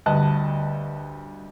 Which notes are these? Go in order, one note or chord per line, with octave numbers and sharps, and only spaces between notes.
D2 G2 D#5 A5 F#6